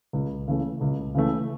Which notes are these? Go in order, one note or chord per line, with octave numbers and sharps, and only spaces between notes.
C#2
C#3 E3 A3
C#2
C#3 E3 A3